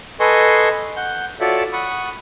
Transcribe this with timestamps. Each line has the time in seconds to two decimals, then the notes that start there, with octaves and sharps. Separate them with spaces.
0.20 A4 B4 D#5 G#5 C6 C#6
0.97 F#5 G6
1.40 F4 F#4 A4 C#5 D5 E5
1.73 F#5 B5 C#6 D#6